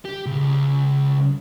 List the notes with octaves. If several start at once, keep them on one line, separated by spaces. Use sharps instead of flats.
G4
C#2